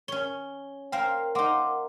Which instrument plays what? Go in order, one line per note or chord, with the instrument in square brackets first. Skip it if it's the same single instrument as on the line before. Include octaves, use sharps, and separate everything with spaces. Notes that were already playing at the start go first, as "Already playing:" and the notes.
[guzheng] C#4 C#5 [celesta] G7
[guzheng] A#3 C5 F5 [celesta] G5
[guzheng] A#3 D#4 [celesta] F#5 C6 D6